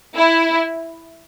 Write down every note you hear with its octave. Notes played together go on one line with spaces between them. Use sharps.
E4